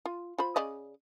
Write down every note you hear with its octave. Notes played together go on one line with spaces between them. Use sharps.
F4
F4 C5 B5
C#3 D5 D#5